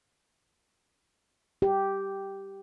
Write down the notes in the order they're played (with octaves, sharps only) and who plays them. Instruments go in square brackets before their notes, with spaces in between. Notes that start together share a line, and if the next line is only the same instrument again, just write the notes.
[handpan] G4